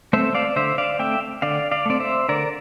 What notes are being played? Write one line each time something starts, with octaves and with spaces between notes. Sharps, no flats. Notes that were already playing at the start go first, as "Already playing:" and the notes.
A3 C4 C5 E5
D5 F5
D3 C5 E5
D5 F5
A3 C4 E5 G5
D3 D5 F5
D5 F5
A3 C4 D5
C5 E5
D3 A#4 D5